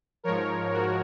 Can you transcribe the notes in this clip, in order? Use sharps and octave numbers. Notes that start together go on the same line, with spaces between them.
G#2 F3 A#4 C#5
F#4 A#4